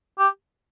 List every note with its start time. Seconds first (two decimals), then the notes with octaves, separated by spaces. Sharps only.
0.18 G4